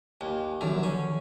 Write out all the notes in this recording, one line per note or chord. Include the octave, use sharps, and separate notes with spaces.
D#2 G#5
F#2 D3 D#3 F3 F#5
C#4